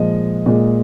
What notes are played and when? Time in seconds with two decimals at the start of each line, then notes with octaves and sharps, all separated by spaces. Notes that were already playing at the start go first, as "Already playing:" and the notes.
Already playing: A#2 F3 G#3 D#5
0.46 A#2 G#3